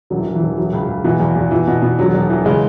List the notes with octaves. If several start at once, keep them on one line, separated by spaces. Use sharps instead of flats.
E1 F#3
E3
E1
E3
E1
E3 F#3
C#2
C#2
B2 E3
E2
E2
B2 E3
B2
B2
E1 F#3
E1
E3
C#3 G#3